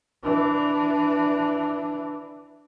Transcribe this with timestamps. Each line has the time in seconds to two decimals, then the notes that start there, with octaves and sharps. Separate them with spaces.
0.23 E3 D4